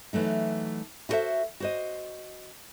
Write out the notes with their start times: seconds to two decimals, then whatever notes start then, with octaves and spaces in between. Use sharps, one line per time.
0.13 E3 F#3 A3 D#4
1.09 E4 F#4 A4 B4 C5 E5
1.60 F#4 C5 D#5